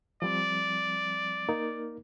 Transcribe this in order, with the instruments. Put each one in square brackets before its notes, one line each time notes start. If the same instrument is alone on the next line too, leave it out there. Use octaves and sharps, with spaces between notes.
[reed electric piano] F3 G3 C4 [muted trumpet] D5
[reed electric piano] A#3 D#4 A#4